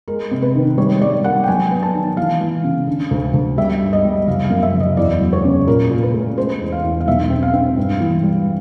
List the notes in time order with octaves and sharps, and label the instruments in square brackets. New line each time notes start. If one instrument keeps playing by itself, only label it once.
[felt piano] G#3 A#4
C3
B4
D#3
G3 C#5
G3 D5
A#3 F#5
G5
F#3 G#5
B3
A5
D#3
E3 F5
E3
C#3
D3
D2
D2
G3 E5
G2
D#5
G3
F#1 F5
F5
F#2
E5
F#1
D#5
E2 D5
F#3
C#5
C#3
A#2 A#4
A#2
B4
A3
G#3 C5
E2
F5
E2
F5
B1 E5
C4
F5
C4
G2
E3
G3